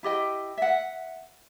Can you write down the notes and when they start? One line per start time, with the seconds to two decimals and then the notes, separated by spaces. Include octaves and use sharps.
0.03 E4 G4 D#5 G5
0.58 E5 F#5